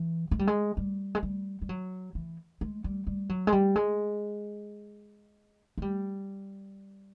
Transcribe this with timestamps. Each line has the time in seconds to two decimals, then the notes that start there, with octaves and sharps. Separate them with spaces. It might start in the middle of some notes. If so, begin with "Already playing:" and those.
Already playing: E3
0.31 G#3
0.39 G3
0.47 G#3
0.77 G3
1.15 G#3
1.23 G3
1.62 G3
1.69 F#3
2.15 E3
2.61 G#3
2.84 G3
3.07 G3
3.29 F#3
3.47 G#3
3.52 G3
3.76 G#3
5.78 G#3
5.82 G3